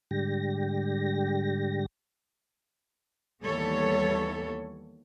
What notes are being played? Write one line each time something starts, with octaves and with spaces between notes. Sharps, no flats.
G#2 D3 G3 G4 A#6
D#2 E3 G3 B3 A4 C#5